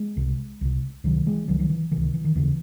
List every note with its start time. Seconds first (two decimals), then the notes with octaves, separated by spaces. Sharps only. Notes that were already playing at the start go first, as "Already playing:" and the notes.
Already playing: G#3
0.17 C2 C3
0.61 C2 C3
1.04 C#2 C3 D#3 F#3
1.26 E3 G#3
1.48 C#2 C3 D#3 F#3
1.59 D#3 F#3
1.70 E3
1.92 C#2 C3 E3
2.03 D#3
2.14 E3
2.24 D#3
2.35 D#2 C#3 E3